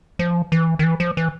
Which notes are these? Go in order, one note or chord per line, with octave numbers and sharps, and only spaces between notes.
F3
E3
D#3
E3
F3
E3